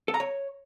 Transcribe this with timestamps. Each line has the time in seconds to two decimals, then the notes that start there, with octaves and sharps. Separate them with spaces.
0.08 A4
0.14 A#5
0.20 C#5